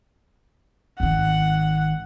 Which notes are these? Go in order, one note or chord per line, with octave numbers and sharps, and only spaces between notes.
G#1 D#3 F#5